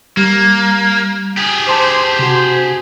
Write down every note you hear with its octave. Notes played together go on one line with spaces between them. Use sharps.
G3 A#3
G4 G#4
C5 A5 C6 D6
C3 F#4